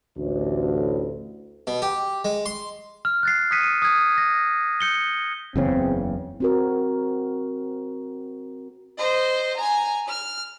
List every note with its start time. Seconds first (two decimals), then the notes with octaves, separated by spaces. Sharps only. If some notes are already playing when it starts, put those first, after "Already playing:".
0.17 A1 D2
1.67 B2
1.82 G4
2.25 G#3
2.46 C6
3.05 F6
3.23 F#6 A6 C7
3.51 D#6 F#6 G#6 B6 C#7 D#7
3.82 D#6 G#6
4.18 A#6
4.81 G6 C#7 G7
5.56 F#1 E2 C#3 C4
6.40 C4 F#4 A#4
8.98 C5 D#5
9.57 G#5 A#5
10.08 F6